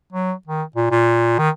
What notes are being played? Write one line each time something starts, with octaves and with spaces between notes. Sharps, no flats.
F#3
D#3
A#2
A#2
D#3